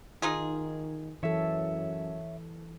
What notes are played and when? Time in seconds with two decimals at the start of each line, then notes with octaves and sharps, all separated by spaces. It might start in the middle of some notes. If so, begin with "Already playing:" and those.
0.22 D#3 D#4 F4 G#4
1.23 F#2 E3 A4 C#5 E5